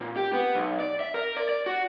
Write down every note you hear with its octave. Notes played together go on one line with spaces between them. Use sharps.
A#2
G4
B3
B1
D5
E5
A#4
D5
D5
F#4